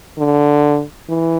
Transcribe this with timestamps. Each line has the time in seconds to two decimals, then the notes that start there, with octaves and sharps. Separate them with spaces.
0.18 D3
1.09 E3